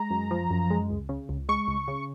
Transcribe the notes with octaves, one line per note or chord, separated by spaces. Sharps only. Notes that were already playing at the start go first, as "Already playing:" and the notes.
Already playing: G#3 A#5
F#2
F3
F#2
G#3
C#2
C#3
C#2
G#3 C#6
C#2
C#3